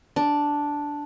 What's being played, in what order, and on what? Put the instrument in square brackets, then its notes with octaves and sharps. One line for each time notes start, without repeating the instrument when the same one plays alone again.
[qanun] D4